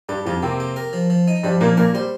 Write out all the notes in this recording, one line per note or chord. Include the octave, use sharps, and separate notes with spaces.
G2 G3 G4
F2 F3 G4
C3 A#3 C4
G4
A#4
F3
F3
D#4
G2 F3 G3
A#2 F3 A#3
A#2 A#3 A#4
G3 C5